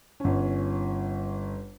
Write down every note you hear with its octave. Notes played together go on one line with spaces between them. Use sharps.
G1 C#4